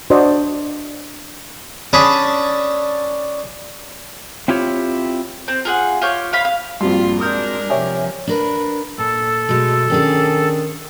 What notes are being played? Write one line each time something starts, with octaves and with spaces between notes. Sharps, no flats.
D4 F#4 C5 D5 D#5
C#4 D4 G#4 A5 B5
C4 E4 F4 G4 C#5
C4
F4 G#4 F#5
F4 G4 C#5
F4 F5 B5
F5
A#1 G2 C4 F4 F#4 C6
G#3 D4 A#4 D#6 F6 G6
C3 F3 G4 C#5 E5 G#5
D4 A#4 B4
A#2 A4
B2 G#3 A3
D#3 C#4 D4 G#4